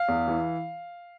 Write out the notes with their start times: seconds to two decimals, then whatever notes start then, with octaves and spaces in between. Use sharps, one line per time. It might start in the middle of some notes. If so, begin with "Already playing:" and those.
Already playing: F5
0.08 E2
0.28 E3